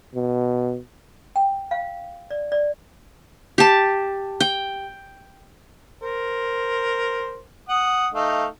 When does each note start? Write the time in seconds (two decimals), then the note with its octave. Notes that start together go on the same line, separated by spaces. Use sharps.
0.15 B2
1.36 G5
1.71 F5
2.31 D5
2.52 D5
3.58 G4 A5
4.40 G5
6.02 A#4 C5
7.69 F#5 D#6
8.14 A3 D#4 F5